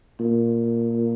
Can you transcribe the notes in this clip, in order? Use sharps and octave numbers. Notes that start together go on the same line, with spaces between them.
A#2